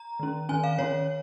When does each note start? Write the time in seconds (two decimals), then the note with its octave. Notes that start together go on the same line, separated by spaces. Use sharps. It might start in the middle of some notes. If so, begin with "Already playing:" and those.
Already playing: A#5
0.20 D#3 C#4
0.49 D#3 C#4 G#5
0.64 F5
0.78 D#3 C#4 C#5